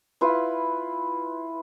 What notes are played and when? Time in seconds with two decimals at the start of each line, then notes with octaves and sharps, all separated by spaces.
0.21 E4 F4 B4